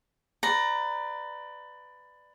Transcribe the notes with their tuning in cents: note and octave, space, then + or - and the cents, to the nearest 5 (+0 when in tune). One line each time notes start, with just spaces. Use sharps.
B4 +15 D5 +15 A#5 +0